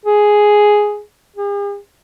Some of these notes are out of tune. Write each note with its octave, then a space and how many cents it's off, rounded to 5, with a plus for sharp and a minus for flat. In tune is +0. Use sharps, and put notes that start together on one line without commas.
G#4 +5
G#4 -45